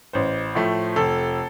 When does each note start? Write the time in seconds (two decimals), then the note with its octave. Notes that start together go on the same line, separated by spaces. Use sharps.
0.13 A1 C5
0.55 A2 F3 A3
0.96 F1 A4